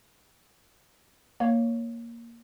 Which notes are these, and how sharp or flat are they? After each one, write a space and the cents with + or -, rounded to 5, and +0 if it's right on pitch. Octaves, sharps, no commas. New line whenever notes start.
A#3 +0 C#5 +5